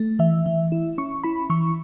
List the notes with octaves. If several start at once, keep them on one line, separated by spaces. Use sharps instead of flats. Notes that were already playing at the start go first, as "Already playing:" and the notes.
Already playing: A3
E3 E5
E3
E4
C#4 C#6
E4 B5
E3 C#6